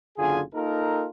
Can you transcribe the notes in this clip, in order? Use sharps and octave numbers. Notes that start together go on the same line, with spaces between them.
F#1 D3 F4 G#4 G#5
A#3 D#4 F4 A4 A#4